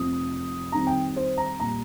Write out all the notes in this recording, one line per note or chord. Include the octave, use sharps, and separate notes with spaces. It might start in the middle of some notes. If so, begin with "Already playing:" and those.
Already playing: F1 F2 F3 C4 D#6
F2 D#3 G3 C4 A#5
G5
C5
A#5
A#2 G3 A#5